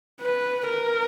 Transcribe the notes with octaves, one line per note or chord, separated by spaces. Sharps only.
B4
A#4